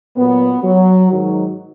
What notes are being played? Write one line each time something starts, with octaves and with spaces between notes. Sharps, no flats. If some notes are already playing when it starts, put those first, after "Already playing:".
A#2 F#3 B3
F#3
G#2 D#3 F#3